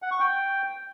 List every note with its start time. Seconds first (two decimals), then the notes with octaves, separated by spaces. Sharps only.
0.02 F#5
0.11 C#6
0.20 G5